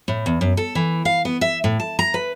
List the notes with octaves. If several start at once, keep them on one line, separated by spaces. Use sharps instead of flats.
A2
E2
F#2
A4
E3
F5
B3
E5
A2
A5
A#5
B4